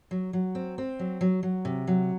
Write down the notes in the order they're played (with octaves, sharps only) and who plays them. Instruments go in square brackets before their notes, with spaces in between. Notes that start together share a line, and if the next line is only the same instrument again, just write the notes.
[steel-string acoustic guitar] F#3
F#3
C4
C4
F#3
F#3
F#3
C3
F#3